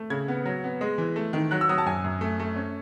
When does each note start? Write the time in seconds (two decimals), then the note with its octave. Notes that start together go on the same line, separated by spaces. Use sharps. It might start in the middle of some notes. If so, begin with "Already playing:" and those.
Already playing: A3
0.10 C#3 G#6
0.28 B3
0.46 F#3
0.64 B3
0.81 G#3
0.98 E3
1.16 A3
1.33 D#3
1.51 F#3 F#6
1.61 E6
1.69 F#3 D#6
1.78 A5
1.86 F#2 G#5
2.04 F#2
2.21 A3
2.40 A3
2.56 C#4